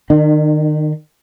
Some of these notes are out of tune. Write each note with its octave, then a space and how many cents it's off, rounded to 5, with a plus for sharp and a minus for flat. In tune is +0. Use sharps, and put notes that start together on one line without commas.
D#3 -25 D4 +45